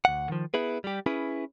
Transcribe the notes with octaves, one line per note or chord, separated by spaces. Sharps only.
D2 F#5
D#3 F3
B3 E4 G#4 B4
G3 G4
C#4 E4 G#4 B4